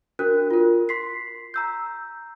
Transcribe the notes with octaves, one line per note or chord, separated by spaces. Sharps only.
D4 F#4 A#4 F#6
F4 A#4
C6 B6 C7
A#5 E6 G6